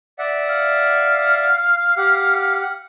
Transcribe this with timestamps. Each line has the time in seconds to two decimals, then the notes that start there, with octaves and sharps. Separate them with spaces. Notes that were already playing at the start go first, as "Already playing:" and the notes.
0.19 D5 E5 F#5
0.49 F5
1.97 G4 F#5